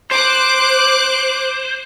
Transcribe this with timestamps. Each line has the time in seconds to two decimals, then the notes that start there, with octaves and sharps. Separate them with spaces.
0.11 C5 D6 F#6